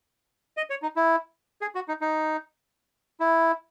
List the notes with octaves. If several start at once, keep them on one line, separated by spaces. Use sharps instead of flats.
D#5
C#5
D#4
E4
G#4
F#4
D#4
D#4
E4